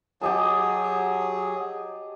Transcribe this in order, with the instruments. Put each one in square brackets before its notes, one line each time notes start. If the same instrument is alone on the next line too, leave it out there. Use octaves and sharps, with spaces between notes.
[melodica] F#3 G#4 [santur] G4 D#5 A5